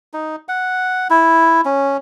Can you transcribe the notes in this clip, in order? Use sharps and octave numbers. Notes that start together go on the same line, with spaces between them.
D#4
F#5
E4
C#4